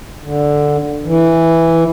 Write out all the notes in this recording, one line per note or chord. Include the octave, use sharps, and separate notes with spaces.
D3
E3